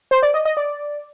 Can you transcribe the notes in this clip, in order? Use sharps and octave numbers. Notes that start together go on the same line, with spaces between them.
C5
D5
D#5
D#5
D5